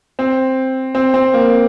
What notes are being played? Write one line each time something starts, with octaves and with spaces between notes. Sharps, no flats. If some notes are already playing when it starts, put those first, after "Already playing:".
C4
C4
C4
A#3